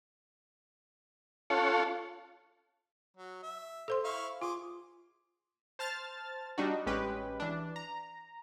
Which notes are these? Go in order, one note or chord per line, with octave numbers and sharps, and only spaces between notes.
C#4 F4 A4 C#5 F#5
F#3
E5
A4 C5 C6
E4 F5 C#6
F4 G#4 C6 D6
C5 A5 F6 A6
G3 D4 D#4 F#4
A1 G#3 C#4 G4 B4
E3 D4
A#5